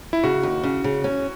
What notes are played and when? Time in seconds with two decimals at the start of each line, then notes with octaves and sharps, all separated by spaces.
0.13 E4
0.23 C#3 F#4
0.43 D#2
0.63 C#3
0.84 C#3
1.04 C#4